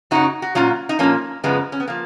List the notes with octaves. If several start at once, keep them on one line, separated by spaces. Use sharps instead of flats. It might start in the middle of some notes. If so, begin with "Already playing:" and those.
F#2 C#3 F#3 D#4 F#4
F#4
A#2 F#3 C#4 F4
D#4
A#2 F3 A#3 C#4
F#2 C#3 F3 G#3 B3
C#4
B3
F3 A#3